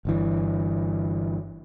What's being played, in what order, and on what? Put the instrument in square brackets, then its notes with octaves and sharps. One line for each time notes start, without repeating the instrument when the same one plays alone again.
[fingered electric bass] G1 G2 E3